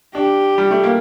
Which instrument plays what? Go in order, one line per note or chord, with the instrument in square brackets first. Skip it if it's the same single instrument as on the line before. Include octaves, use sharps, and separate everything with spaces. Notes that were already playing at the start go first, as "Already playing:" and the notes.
[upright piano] D4 [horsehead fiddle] G4
[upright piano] G3
A3
A#3